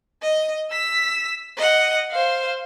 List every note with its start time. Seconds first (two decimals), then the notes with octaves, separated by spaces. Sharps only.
0.22 D#5
0.71 E6 B6
1.57 D#5 F#5
2.11 C5 F5